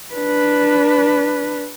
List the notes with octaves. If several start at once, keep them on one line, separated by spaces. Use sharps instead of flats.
D4 B4